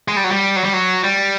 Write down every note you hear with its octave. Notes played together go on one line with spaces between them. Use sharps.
G#3
G3
F#3
G3
F#3
G3
F#3
G3